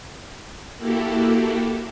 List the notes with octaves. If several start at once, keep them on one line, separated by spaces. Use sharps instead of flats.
A#3 E4 F#4 G4 A4